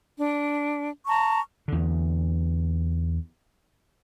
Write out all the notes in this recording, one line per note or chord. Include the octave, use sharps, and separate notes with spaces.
D4
A5 A#5 C#6
E2 D3